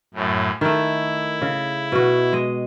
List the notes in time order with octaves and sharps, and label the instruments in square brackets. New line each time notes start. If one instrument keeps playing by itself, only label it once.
[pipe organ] F#2 A2
[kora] D#3 A3 [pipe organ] E4
[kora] C#3
B2 F#4
G#3 D#5